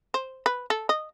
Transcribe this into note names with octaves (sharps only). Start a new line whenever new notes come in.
C5
B4
A4
D#5